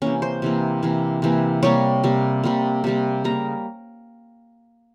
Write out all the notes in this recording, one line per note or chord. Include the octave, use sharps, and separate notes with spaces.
C3 E3 A#3 C#4
C5
C3 E3 A#3
C3 E3 A#3
C3 E3 A#3
C3 G3 A#3 C#5
C3 G3 A#3
C3 G3 A#3
C3 G3 A#3
C#3 G3 A#3 A#5